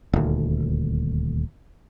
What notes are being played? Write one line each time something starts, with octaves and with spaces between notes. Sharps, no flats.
D#1 D2